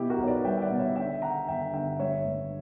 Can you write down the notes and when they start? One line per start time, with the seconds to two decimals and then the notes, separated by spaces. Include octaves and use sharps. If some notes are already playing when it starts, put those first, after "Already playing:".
Already playing: B2 E4 G4
0.10 F#4 A#4
0.19 B1 C#5
0.27 B4 D5
0.44 G3 E5 G5
0.58 E5
0.62 D5 F#5
0.70 B2
0.79 C#5 E5
0.96 D3 E5 G5
1.22 D3 F#5 A#5
1.48 G1 E5 G5
1.73 G1 E5 G5
1.99 G2 C#5 E5
2.25 G2